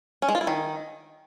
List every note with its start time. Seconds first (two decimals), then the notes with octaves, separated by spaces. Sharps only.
0.22 C#4
0.29 G#3
0.35 F4
0.41 E4
0.47 D#3